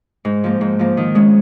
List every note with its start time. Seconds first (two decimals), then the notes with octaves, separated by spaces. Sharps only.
0.25 G#2
0.44 F3 A#3
0.61 G#2
0.79 F3 A#3
0.97 D#3
1.15 G#3 C#4